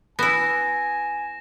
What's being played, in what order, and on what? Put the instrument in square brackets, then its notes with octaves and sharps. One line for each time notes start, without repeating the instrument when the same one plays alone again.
[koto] B3 E4 [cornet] G#5 [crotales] A#6 E7